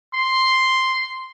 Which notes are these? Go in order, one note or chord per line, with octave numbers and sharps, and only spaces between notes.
C6